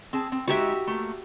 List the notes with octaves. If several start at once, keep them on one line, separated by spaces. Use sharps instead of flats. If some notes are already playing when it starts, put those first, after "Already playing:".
C4 G#4 A5
C4
G#3 D#4 F#4 G4 E5
A3 A#3